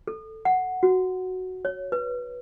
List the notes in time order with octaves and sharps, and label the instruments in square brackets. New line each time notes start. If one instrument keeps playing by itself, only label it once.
[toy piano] A4
F#5
F#4
C#5
B4